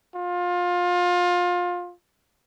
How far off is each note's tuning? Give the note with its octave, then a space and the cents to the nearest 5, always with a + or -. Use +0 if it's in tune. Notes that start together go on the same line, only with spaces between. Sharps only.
F4 +25